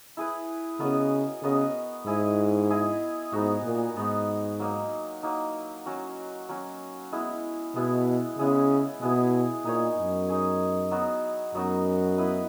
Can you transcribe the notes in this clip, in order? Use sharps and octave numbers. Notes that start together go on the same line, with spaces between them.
E4 G#4 B4
C#3 B3 F#4 A#4 D#5
C#3 B3 F#4 A#4 D#5
G#2 E4 G#4 D#5
E4 G#4 D#5
G#2 B3 D#4 F#4
A#2
G#2 B3 D#4 F#4
F#3 A#3 D#4
F#3 A#3 D#4
F#3 C#4 F#4
F#3 C#4 F#4
G#3 B3 E4
B2 G#3 B3 E4
C#3 G#3 B3 E4 G#4
B2 G#3 B3 E4 G#4
A#2 D#4 G#4 C#5
F#2
D#4 G#4 C#5
F#3 B3 D#4 F#4
F#2 F#3 B3 D#4 F#4
B3 E4 B4 D#5